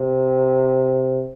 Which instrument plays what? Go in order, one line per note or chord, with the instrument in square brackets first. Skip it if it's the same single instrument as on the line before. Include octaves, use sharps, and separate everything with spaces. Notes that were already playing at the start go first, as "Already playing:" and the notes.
Already playing: [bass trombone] C3